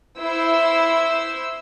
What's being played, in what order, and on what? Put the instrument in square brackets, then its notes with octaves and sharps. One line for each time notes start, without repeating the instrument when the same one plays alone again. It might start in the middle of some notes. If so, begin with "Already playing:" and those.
[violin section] E4 C5 E6